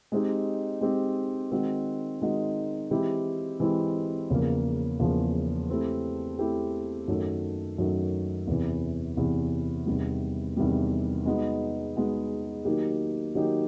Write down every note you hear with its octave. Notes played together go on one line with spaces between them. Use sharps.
G#3 C4 D#4 G4
G#3 C4 D#4 G4
D#3 G#3 C4 D#4 F#4
D#3 G#3 C4 D#4 F#4
E3 G#3 C4 E4 G4
E3 G#3 C4 E4 G4
E2 C#3 F3 A#3
E2 C#3 F3 A#3
A3 C4 E4 G4
A3 C4 E4 G4
F#2 D#3 F#3 A3
F#2 D#3 F#3 A3
E2 C3 E3
E2 C3 E3
E2 C3 D#3 G3
E2 C3 D#3 G3
G#3 B3 D#4 F#4
G#3 B3 D#4 F#4
D#3 F#3 A#3 D#4 G4
D#3 F#3 A#3 D#4 G4